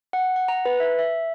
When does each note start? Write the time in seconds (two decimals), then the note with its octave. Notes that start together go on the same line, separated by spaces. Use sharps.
0.13 F#5
0.36 F#5
0.48 A#5
0.65 B4
0.80 E5
0.99 E5